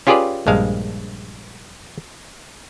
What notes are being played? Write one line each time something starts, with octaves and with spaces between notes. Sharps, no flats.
C#4 F4 G4 G#4 B4 D5
A#1 G2 G#3 F5